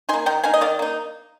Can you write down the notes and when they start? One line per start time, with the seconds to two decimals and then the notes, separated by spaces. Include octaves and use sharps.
0.09 D#4 G#5 C6
0.13 A#3
0.26 D#3 G5 A#5
0.44 A#3 D#4 F5 G#5
0.54 D#5
0.61 D#3 D5 F5
0.79 A#3 D#4